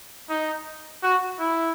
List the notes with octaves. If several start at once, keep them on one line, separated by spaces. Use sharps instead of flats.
D#4
F#4
E4